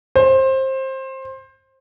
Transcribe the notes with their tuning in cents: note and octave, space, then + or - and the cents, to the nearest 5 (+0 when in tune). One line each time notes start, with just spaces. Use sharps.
C5 +20